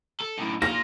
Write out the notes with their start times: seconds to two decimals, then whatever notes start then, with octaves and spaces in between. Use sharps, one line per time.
0.20 A4
0.38 F#2 A2
0.62 A#2 F4 A#6